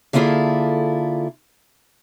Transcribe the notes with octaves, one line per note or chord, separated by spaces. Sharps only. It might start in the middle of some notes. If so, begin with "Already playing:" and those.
D3 A#3 E4 F4 G#4 A4